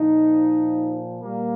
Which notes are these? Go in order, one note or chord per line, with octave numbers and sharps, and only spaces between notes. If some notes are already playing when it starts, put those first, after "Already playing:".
Already playing: A#2 F3 D#4
A#2 G3 A#3